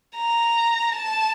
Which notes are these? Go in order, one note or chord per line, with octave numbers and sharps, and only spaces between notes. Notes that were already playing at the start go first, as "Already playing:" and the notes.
A#5
A5